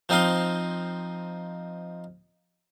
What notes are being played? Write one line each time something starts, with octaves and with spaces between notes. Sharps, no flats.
F3 C4 D#4 D#5 F5 C6